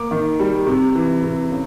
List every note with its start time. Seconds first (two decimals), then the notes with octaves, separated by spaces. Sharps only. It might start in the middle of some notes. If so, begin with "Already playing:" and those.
Already playing: A#3 D6
0.11 D#3
0.40 G3
0.67 C3
0.95 E3
1.24 C3
1.51 C#3